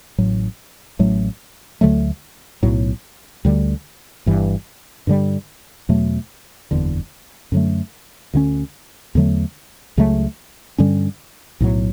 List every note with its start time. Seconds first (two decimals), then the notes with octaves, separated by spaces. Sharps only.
0.18 A1 A2 F#3
0.99 A1 A2 F#3 A3
1.81 D2 D3 F#3 A3
2.63 B1 A2 F#3
3.45 D2 D3 G3
4.26 G1 G2 E3
5.07 G2 D3 G3
5.89 E2 B2 F#3 A3
6.71 F#1 E2 D3
7.52 F#2 D3 F#3 A3
8.34 D2 D3 A3 C#4
9.15 E2 D3 F#3 A3
9.97 C#2 C#3 F#3 A3
10.78 G2 D3 G3 C#4
11.60 B1 A2 F#3